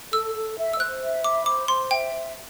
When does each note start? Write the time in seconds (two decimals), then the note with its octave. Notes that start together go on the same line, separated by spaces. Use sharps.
0.12 A4 E6
0.35 A4
0.57 E5
0.73 E6
0.80 C5 F#6
1.02 E5
1.24 B5 D6
1.46 C5 D6
1.68 C5 C6
1.91 E5 G5